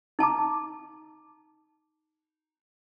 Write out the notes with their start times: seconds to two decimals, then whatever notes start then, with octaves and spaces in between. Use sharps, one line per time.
0.19 D#4 A5 A#5 D6